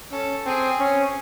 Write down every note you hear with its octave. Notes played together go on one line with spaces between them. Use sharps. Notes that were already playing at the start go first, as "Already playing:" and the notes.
C#4 A4
C4 G#4
C#4